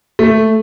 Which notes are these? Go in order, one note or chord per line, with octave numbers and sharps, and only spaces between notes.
A3